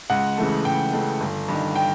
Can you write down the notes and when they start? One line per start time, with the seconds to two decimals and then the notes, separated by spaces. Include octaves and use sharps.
0.10 C#2 F#5
0.38 C#3 E3 A3
0.65 C#2 G5
0.93 C#3 E3 A3
1.21 G1
1.48 G2 D#3
1.76 G5